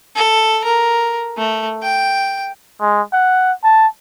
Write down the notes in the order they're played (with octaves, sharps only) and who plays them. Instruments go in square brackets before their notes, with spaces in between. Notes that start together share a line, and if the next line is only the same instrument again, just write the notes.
[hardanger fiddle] A4
A#4
A3
G5
[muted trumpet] G#3
F#5
A5